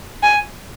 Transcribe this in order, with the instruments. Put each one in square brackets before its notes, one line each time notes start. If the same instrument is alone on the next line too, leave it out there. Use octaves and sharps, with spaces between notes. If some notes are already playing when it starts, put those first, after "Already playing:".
[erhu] G#5